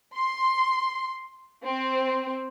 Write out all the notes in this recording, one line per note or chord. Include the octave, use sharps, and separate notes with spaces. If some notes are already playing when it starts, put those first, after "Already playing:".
C6
C4